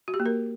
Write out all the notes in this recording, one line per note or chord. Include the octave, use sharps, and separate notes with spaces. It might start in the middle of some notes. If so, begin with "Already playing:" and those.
F#4
G4
A#3
A#4